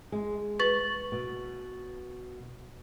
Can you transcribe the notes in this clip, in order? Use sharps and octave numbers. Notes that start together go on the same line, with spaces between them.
G#3
B4 C#6 A6 F#7
B2